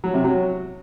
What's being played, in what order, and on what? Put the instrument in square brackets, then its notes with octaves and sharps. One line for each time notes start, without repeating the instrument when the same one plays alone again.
[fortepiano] F#3
C3
F#3